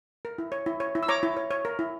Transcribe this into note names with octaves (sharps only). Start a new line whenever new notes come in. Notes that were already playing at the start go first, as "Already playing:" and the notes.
A#4
E4
C#5
E4
C#5
E4
E6
C#5 A#5 D6
E4
C#5
C#5
A#4
E4